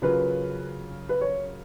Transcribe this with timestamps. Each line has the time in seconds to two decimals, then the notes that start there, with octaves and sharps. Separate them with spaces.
0.02 C#3 F#3 C#4 F4 A#4 B4
1.09 B4
1.21 C#5